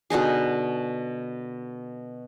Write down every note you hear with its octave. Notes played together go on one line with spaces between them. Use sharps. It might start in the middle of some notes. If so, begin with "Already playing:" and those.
B2 D3 D#4 G#4